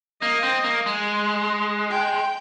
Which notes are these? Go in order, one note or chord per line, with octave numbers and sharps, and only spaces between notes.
A#3 D#5
C4
A#3
G#3
G5